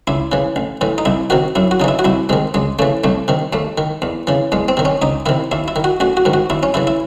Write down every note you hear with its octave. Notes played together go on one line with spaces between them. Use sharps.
C#2 E4
C#3 E3
A1
A2 E3
D#4
C2 E4
C3 D#3 F#4
F#2 E4
F#4
C#3 E3 D#4 E4
F#4
C2 E4
C3 D#3 G#3
C#2 G#3
C#3 E3 A3
C2 A3
C3 D#3
D#2 A3
D#3
E2
C#3 E3
E2 G#3
C4
C3 D#3
C#4
C#2 D#4
C3 D#3 E4
D#2 E4
E4
D#3
F#4
A1 F#4
F#4
G#2 D#3
F#4
D#2 E4
C#4
C#3 E3 E4
E4